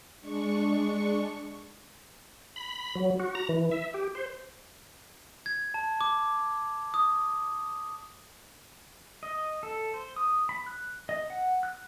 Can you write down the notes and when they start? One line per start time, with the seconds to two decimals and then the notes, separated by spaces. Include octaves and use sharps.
0.20 G#3 D4 C#6
2.56 B5
2.95 F#3
3.19 F#4
3.35 A#5
3.49 E3
3.71 E5
3.94 G4
4.15 C5
5.46 G#6
5.74 A5
6.01 D6
6.94 D#6
9.23 D#5
9.63 A4
9.94 C5
10.16 D#6
10.49 B5
10.66 F#6
11.09 D#5
11.30 F#5
11.63 F#6